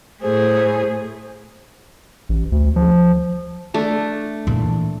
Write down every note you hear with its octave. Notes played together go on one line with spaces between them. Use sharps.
A2 A3 G#4 C5
A1
D2
F3
A3 D4 A5
A#2 E3